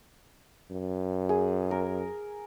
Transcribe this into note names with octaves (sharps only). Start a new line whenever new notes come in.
F#2
G#4
A#4